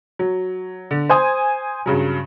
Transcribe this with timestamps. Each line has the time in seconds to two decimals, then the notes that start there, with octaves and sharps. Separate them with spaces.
0.19 F#3
0.91 D3
1.09 C5 G#5 D#6
1.86 G2 C#3 F#3